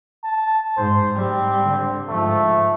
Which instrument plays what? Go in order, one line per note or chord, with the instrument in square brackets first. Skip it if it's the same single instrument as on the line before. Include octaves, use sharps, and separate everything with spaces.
[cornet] A5
[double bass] G#2 [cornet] C5
[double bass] G3 [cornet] C4
[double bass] D3
[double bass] G#2 F3 [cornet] A3